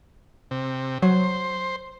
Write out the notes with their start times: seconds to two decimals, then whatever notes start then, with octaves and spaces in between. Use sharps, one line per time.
0.51 C3
1.02 F#3 C5